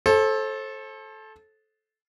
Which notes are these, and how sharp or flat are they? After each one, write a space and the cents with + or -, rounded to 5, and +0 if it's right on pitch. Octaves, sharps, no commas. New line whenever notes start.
A4 -15 C5 +35